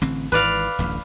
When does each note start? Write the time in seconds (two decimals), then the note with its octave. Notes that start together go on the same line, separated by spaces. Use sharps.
0.02 A1 D3 C4
0.32 G#1 G#2 E3 B4 D5 F5
0.79 D1 A1 D2